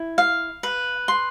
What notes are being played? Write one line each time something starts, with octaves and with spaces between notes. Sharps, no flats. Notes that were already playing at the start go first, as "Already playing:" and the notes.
Already playing: E4
F5
B4
C6